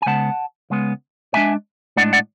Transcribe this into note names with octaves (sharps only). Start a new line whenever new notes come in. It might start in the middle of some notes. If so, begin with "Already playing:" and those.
G#5
C#3 G#3 B3 F#5 A5
C#3 G#3 B3
A2 G#3 D4 E5 G#5
A2 G#3 D4 D5 F#5
D5 F#5